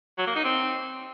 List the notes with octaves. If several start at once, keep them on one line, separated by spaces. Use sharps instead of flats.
F#3
A#3
D#4
C4